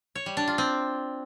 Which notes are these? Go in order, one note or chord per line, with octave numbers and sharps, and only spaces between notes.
C#5
G3
D4
F4
C4